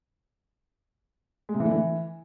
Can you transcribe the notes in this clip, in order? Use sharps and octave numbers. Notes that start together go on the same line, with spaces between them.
G#3
C3
E3
D3
E3